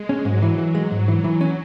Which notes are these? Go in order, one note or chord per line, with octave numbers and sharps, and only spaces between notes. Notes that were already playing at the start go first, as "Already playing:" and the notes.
Already playing: G#3
C#4
G#2 F#3
E3
E3
G#3
G#2
E3
E3
C#4